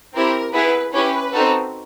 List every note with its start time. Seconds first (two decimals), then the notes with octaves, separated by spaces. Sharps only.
0.14 C4 E4 G4 A#4
0.53 B3 E4 G#4 B4
0.93 C#4 E4 G4 B4
1.32 C4 D#4 F#4 A4